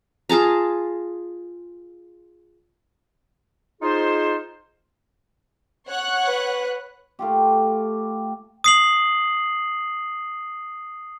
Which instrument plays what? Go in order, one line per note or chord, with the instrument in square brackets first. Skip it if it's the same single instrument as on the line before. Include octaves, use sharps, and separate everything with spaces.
[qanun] F4 G#4 A5 A#5
[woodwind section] D#4 F4 G#4 C5
[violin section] C#5 F#5 F#6
[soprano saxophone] B4
[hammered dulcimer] A3 F4 G4
[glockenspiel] D#6 C7 F#7